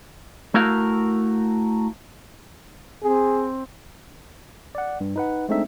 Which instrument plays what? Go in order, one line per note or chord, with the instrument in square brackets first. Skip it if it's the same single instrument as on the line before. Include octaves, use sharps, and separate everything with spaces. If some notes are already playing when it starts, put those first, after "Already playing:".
[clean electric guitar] A3 E4 F#4 A#4 F5
[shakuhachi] C4 [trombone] G#4
[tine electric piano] D5 F#5
G2
D#4 B4 F#5
G#3 A3 C4 D4 D#4 E5